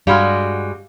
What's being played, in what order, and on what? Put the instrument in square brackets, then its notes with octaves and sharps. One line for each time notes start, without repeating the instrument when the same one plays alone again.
[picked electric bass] G2 [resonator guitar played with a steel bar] G3 G#3 F#4 [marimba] F5 B5 F6